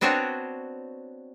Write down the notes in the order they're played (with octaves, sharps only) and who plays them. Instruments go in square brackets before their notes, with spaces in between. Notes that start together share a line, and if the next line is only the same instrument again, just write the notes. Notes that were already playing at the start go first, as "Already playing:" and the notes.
[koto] B3 C4 D4 F#4 C5 C#5